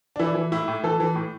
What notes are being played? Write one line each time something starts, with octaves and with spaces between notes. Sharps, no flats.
D4
E3 E4
E3
A2 E4
A2
E3 A4
E3
A2